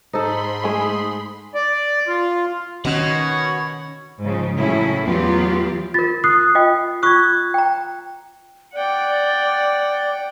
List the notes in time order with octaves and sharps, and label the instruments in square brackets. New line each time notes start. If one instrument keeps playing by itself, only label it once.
[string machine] G#2 B5 C6 [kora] D#4 A4 [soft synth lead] C5
[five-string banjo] G#3 A3 G#4 [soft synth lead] D#6
[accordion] D5
F4
[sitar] B2 [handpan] D#3 C#4 [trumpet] C#5 [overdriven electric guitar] F#5
[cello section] G#2 C#3 F3
A2 C#3 F#3 C#4 E4
E2 E3 F#3 B3 F4 G4
[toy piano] F4 A#4 [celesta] A6
[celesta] D#6 F#6 C7
[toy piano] F4 D#5 G5
[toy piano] F4 C#6 D#6 [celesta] F#6 G#6
[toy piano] G5 A#5
[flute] D5 [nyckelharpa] F#5 G5